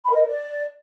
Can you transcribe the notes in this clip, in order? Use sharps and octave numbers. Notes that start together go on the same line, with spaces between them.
B5
A#4
D#5
A#4
D5